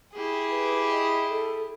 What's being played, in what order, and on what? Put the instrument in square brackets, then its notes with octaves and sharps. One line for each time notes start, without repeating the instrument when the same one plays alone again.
[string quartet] E4 G4 G#4
[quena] B4
D#5
A4